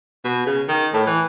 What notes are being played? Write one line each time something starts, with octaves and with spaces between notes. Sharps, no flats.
B2
C#3
D#3
A2
E3